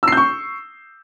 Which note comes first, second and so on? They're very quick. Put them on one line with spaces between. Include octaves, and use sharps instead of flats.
E6 C7 G6 C#6